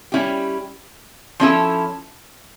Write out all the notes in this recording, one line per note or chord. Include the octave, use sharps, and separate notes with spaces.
G3 C#4 E4 G4
F3 C#4 E4 A4